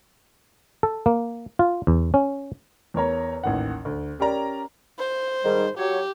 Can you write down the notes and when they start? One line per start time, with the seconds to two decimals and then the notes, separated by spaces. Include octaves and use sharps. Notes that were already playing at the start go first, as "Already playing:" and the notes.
0.83 A4
1.06 A#3
1.59 F4
1.87 E2
2.14 C#4
2.94 E2 A#4 C#5 A#5
3.44 A1 D#2 F#5
3.85 D2
4.19 C#4 G4 A#4 D5 A#5
4.99 C5
5.44 G#2 D#3 G3
5.78 F#3 G4 C#5